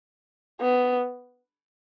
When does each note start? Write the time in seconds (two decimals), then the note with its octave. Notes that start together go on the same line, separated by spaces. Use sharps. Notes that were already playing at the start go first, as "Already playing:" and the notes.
0.61 B3